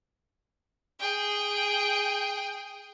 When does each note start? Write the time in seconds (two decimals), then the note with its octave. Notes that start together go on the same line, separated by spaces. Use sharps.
1.00 G#4 G5